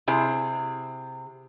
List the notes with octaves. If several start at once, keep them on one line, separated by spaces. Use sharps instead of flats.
C3 E4 G#4